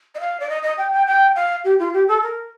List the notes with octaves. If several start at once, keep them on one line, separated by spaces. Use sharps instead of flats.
D#5
F5
D5
D#5
D#5
G5
G5
G5
F5
G4
F4
G4
A4
A#4